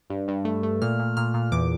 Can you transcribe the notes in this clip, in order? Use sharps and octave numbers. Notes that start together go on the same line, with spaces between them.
G2
G2
A3
A3
A#2 F6
A#2
A#2 F6
A#2
E2 D6